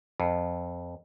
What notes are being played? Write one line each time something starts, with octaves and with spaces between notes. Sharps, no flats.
F2